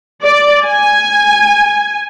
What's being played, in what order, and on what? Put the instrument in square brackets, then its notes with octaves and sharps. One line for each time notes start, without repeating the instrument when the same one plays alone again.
[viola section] D5
G#5